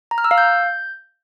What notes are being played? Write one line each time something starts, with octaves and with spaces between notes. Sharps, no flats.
A#5
F6
E6
F5
G6